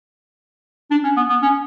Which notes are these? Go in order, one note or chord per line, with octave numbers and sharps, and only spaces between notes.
D4
C#4
B3
B3
C#4